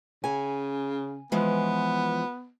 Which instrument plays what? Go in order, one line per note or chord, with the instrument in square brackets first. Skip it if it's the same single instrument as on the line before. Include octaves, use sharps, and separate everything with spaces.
[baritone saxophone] C#3 [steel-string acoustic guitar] G#5
[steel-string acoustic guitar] E3 F3 G#3 [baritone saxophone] B3